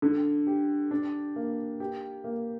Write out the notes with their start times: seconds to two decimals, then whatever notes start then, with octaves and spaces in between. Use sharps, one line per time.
0.02 D3
0.47 G4
0.91 D4
1.36 A#3
1.80 G4
2.24 A#3